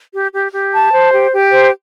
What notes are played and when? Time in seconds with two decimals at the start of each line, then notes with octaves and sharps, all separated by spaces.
0.13 G4
0.33 G4
0.53 G4
0.73 A5
0.92 C5
1.12 G4
1.32 G4
1.52 C5